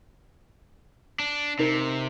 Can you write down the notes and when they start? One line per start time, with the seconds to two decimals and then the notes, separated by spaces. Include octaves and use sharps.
1.19 D4
1.59 C3 D#4 A#4